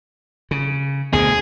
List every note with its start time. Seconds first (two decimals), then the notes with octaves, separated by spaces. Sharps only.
0.51 C#3
1.13 D2 B2 D3 G#4